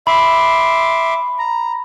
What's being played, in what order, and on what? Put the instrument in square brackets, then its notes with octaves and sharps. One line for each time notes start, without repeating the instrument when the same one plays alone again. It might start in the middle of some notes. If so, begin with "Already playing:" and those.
[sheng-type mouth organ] E5 C6 D6 [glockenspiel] B5
[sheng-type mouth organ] A#5